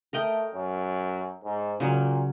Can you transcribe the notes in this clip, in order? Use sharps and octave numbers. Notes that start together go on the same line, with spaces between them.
A3 A#4 D#5 G5
F#2
G#2
A#2 C#3 F#3